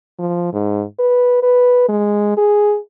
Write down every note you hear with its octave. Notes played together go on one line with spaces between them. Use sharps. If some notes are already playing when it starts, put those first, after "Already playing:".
F3
G#2
B4
B4
G#3
G#4